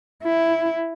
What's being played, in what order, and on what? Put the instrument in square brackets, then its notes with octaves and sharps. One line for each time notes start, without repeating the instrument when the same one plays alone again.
[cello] E4